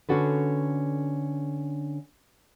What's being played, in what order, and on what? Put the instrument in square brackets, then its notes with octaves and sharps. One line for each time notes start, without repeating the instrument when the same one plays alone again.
[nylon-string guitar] D3 C#4 D4 F#4 A4 B4